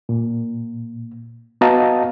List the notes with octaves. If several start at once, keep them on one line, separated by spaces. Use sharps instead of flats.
A#2
B3 F#4 D#5 F5 A5 A#5